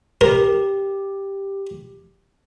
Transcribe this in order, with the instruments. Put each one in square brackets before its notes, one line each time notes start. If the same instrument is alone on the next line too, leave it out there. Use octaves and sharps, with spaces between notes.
[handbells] G4 [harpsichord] A#4